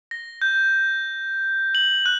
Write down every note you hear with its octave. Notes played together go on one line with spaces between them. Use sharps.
A#6
G6
F#7
F#6